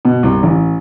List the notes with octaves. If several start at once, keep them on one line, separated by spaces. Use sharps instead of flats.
B2
C2
A1